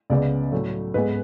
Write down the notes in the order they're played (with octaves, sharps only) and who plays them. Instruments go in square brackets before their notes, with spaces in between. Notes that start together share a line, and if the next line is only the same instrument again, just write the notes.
[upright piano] C#2 C#3 G#3 B3 D5
A2 F#3 A3
G#2 G#3 B3 B4